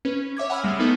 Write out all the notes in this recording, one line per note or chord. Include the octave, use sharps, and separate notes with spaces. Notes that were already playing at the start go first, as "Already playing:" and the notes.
C#4 B4
C#5 E5 D6 G#6
F#5 G#5 B5 E6 F6
G3 G#3
G#3 A3 B3 D#4 A4 D#5